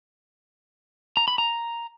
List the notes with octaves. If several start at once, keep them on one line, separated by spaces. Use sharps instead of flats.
A#5
B5
A#5